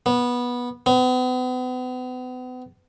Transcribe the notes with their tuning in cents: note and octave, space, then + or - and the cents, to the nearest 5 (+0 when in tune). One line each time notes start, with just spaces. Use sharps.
B3 -15
B3 +40